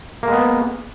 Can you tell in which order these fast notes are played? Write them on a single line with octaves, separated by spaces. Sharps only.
A#3 G#3 B3